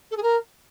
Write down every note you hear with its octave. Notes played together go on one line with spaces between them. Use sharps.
A4
G#4
A#4